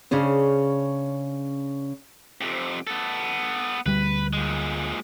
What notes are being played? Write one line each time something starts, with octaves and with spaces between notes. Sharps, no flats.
C#3 C#4 D4 G#4 C5
F2 C3
B3 A4
D2 G3 B4
A#2 G#3